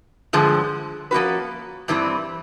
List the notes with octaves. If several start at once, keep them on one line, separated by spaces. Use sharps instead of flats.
G2 D3 F3 G#3
F3 A#3 C#4 F#4 B4
G2 E3 G3 C4